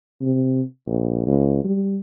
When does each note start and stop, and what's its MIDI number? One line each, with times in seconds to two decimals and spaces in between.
0.21 0.62 48
0.87 1.22 34
1.26 1.61 37
1.64 2.01 55